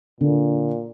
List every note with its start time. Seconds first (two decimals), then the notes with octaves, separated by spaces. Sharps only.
0.21 A#2 D3